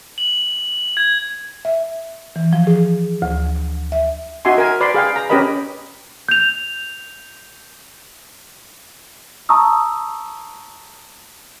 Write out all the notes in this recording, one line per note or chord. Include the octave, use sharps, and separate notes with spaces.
F#7
G#6
E5
E3
F3
G#4
D2
E5
D#4 F#4 E5 G#5 C6
A#4 G#5
B4 D5 B5 C6
G#4 F5 G5
A#5
C#4 G4 A#4 B4 D#5 B5
G6 F7
A5 A#5 C#6 D#6 E6